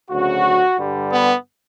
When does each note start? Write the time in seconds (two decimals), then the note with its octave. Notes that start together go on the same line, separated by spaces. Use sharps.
0.11 D2 C#3 F#3 F#4
0.78 G2 D3 G3
1.11 B3